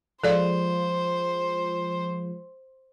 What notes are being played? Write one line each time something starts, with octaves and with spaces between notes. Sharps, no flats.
F3 G#3 F4 A4 C5 D5